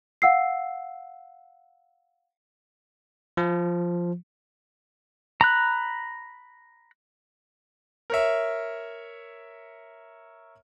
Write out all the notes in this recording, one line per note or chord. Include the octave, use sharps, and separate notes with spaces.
F5 F#5 E6 C7
F3
A#5 B5 F#6
A#4 C#5 E5